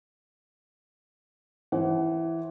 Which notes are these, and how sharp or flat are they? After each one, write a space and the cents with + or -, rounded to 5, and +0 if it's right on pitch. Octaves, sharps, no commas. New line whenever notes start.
E3 +0 C5 +20 F#5 +30